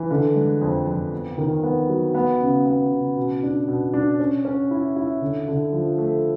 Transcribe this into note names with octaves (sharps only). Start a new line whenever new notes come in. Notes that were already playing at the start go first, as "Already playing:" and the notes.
Already playing: E3
D3
G#3
F2
F2
B3
D#3
B3
F#3
B3
C#3
B3
C#3
B2
D4
B2
D4
C#4
C#4
E4
E4
D3
D3
F3
A3